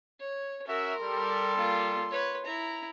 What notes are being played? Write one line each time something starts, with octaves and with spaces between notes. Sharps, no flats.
C#5
C#4 F#4 A#4 E5
G3 A4 C6
A#3 F4
B4 C#5
E4 A#5